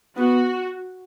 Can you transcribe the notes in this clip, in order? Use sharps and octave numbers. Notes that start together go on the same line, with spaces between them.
B3 F#4